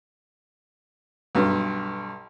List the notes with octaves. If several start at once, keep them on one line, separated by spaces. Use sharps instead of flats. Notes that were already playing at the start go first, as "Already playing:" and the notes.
B1 G2